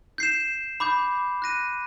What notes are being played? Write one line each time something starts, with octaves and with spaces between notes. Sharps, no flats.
G6 C7 E7
B5 D6 G6
F#6 A#6 D#7